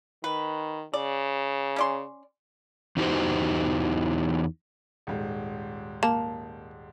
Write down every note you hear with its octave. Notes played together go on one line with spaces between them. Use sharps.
D#3 B4
C#3 D5
C#4 D5 C6
E2 E3 D#4 F#4 G4 C5
D#1 G#2
A#3 A5